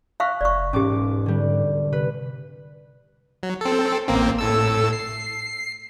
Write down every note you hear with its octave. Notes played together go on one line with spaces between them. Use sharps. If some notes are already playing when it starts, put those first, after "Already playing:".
E5 F5 C#6 F6 F#6
F1 D5 C#6
E1 G#2 C#4 G4 D6
D3 G3
C3 B4
F#3
C4 A4
A1 A#3 C4
A2 A4 E6
C7